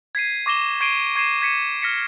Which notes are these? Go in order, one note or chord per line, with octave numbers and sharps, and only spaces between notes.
G#6 B6 C7 D#7
C#6 D6 A#6 E7 G7
C#6 G#6 C7 D7 D#7 G7
C#6 G#6 C7 D#7 E7
G#6 B6 C#7 D#7 E7
F6 A#6 B6 C#7